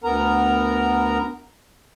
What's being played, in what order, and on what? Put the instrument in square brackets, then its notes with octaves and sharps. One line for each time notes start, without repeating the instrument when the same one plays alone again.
[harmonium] D2 B3 A#4 A#5